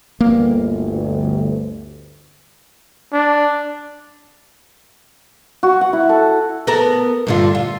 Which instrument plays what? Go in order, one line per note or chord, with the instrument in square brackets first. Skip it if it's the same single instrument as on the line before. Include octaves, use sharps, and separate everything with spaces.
[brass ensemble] G1 D2 [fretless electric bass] A#3
[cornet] D4
[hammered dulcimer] F#4
F#5
E4
A4
[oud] B3 A4 A#4
G2 D3 F4
F4